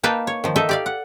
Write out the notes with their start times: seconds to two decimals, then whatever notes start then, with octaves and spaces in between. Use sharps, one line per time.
0.03 A#3 D#4 B4 F5 G5 A5
0.27 C#5
0.44 D#3 F3
0.56 D#4 A4 D#5 E5
0.69 G4 D5 F5
0.86 F#5